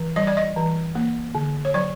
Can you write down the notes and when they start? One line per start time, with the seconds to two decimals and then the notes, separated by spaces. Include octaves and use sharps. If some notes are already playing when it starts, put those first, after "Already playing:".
Already playing: E3
0.16 G3 D#5
0.27 D5
0.37 D#5
0.57 E3
0.95 A#3
1.35 D3
1.65 C#5
1.74 F#3 D5